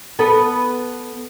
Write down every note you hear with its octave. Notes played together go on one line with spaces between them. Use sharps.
B3 A4 B4